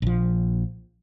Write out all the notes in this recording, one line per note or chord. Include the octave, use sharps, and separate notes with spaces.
A#1 F3